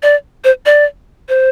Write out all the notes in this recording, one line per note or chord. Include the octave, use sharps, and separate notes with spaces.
D5
C5
D5
C5